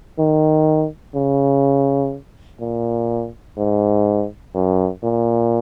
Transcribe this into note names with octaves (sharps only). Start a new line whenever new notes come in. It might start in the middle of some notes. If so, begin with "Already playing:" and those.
D#3
C#3
A#2
G#2
F#2
A#2